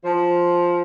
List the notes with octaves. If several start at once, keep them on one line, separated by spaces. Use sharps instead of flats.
F3